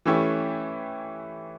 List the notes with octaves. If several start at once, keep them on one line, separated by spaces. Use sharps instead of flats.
E3 A3 C#4 E4 G4